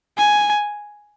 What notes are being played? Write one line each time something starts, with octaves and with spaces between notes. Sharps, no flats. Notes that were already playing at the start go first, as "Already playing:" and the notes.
G#5